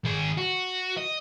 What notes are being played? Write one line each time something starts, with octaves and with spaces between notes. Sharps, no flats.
D#3 G#4
F#4
D#5